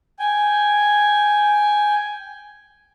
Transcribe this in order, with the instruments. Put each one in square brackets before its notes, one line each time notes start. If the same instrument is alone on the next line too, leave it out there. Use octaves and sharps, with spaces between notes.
[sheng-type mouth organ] G5 G#5